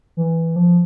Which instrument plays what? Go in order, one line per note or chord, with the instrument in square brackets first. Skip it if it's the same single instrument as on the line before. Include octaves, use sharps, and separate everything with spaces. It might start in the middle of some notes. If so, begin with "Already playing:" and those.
[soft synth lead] E3
F3